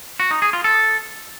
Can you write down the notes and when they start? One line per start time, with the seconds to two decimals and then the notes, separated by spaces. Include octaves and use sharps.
0.20 F#4
0.31 D#4
0.42 G#4
0.53 F4
0.64 A4